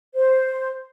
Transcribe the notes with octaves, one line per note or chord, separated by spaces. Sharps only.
C5